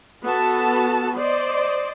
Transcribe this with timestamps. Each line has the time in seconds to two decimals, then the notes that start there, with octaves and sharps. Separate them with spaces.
0.23 B3 F#4 A4 A5
1.14 C5 D5 D#5